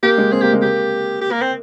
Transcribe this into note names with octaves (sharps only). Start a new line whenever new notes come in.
A#3 G4
G#3
C4 G#4
A#3 G4
G#3
A#3 G4
G4
A#3
C4